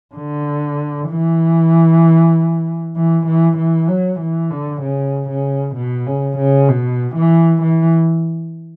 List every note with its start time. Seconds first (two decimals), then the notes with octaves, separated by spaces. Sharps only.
0.15 D3
1.09 E3
2.96 E3
3.27 E3
3.57 E3
3.89 F#3
4.20 E3
4.51 D3
4.82 C#3
5.30 C#3
5.76 B2
6.06 C#3
6.38 C#3
6.69 B2
7.15 E3
7.63 E3